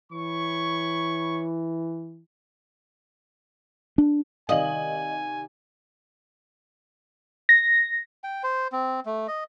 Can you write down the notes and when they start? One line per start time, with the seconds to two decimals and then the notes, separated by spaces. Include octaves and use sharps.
0.12 E3 C#5 B5 C#6
3.98 D4
4.49 C3 D#3 A#4 D5 D#5 F5 G#5 F#7
7.49 A#6
8.24 G5
8.43 C5
8.72 C4
9.06 A3
9.28 D#5